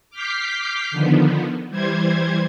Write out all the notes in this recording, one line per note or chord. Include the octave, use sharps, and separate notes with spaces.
D6 F6 G6 B6 C7
D3 D#3 F3 B3
E3 G3 C5 G#6